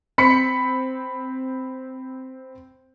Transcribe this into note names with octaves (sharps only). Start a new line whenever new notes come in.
C4 B5 B6 C#7